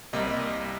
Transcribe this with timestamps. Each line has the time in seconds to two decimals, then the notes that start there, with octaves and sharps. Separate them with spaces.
0.13 C2 C3 G3 A#3 D#5
0.27 D#5